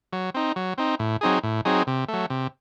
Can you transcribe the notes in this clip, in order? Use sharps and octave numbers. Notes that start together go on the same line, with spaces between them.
F#3
C4 D#4
F#3
C4 D#4
A2
F#3 C4 D#4 G#4
A2
F#3 C4 D#4 G#4
C3
F#3 A3
C3